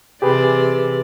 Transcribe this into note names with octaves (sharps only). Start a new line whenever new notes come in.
C3 E3 G4 G#4 B4 D5